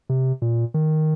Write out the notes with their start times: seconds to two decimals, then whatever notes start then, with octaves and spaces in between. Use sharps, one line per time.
0.09 C3
0.42 A#2
0.74 D#3